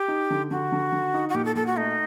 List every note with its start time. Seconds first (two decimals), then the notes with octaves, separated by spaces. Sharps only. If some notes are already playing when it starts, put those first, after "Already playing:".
Already playing: G4
0.08 D#4
0.30 D3
0.51 D3 F#4
0.72 D3
0.92 D3
1.14 D#4
1.29 F#4
1.34 A#2 G4
1.45 A4
1.55 A#2 A4
1.67 F#4
1.77 A3 D#4